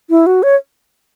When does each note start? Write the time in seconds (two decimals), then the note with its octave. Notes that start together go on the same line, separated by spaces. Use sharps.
0.10 E4
0.26 F#4
0.43 C#5